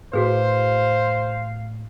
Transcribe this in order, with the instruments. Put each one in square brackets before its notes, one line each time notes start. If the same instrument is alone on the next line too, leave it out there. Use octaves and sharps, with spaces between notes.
[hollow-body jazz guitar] A2 [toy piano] F#4 G#4 B4 [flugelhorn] C5 [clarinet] F5